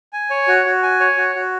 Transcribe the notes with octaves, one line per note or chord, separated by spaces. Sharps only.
G#5
C#5
F#4
F#4
G#5
C#5
F#4
F#4